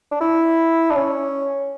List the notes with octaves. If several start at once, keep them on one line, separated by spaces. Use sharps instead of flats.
D4
E4
D4
C#4